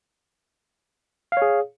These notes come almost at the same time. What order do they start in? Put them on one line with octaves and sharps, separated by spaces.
F5 C#5 G#4